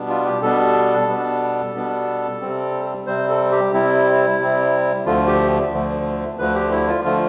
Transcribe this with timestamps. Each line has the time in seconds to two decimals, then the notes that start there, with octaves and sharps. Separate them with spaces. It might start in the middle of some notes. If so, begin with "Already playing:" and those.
Already playing: B2 G3 B3 D4
0.09 F4
0.26 G4
0.42 B2 G3 B3 D4 A4
1.09 B2 G3 B3 D4
1.75 B2 G3 B3 D4
2.41 C3 G3 C4
3.07 C3 G3 C4 C5
3.30 A4
3.52 G4
3.73 C3 G3 C4 E4
4.40 C3 G3 C4
5.06 D2 D3 F3 A3 F4
5.27 G4
5.72 D2 D3 F3 A3
6.38 D2 D3 F3 A3 B4
6.55 G4
6.72 E4
6.88 F4
7.05 D3 F3 A3 F4